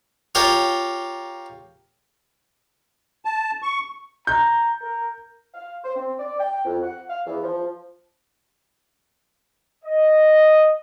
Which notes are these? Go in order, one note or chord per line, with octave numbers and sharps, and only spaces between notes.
F4 G4 A#4 C#5
A5
C#6
A#5 G6
A#4
F5
C5
C4
D5
G5
F2
F#5
F5
E2
F3
D#5